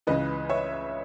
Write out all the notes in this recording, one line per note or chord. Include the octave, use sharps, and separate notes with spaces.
C#2 C#3 E3 B4 D#5
C#5 E5